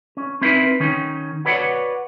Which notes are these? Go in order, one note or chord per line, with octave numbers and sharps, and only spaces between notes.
C#4
C4 D#4 E4 A#4 B4
D#3 C#4 D#4
F#4 B4 C#5 D5 F5 F#5